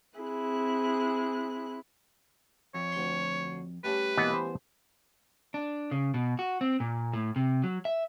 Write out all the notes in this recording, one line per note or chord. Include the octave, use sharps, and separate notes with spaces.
C4 E4 G#4 F#6
F2 C#5
D2 C6
G3 A3 C#4 B4
B2 E3 A#3 B3 D#5 F#5
C5
D4
C#3
B2
F#4
C4
A#2
A2
C3
F#3
E5